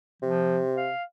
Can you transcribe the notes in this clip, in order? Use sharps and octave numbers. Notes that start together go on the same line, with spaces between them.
C3 F3
F5